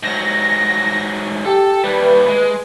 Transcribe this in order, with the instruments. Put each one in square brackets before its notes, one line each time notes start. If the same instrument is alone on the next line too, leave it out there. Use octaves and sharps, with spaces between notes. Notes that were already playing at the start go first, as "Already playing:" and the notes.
[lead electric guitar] G#2 F#3 [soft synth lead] A#6
[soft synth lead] G4 [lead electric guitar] A4
[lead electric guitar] D#2 G3 [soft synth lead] B4
[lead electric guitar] G#3